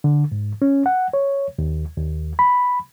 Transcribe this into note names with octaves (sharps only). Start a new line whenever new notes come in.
D3
G#2
C#4
F#5
C#5
D#2
D#2
B5